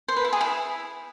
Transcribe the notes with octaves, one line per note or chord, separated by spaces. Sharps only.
C5
B4
E4
G#4
E4